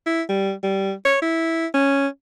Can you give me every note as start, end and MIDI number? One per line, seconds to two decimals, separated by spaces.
0.06 0.22 64
0.29 0.52 55
0.63 0.93 55
1.05 1.18 73
1.22 1.66 64
1.74 2.07 61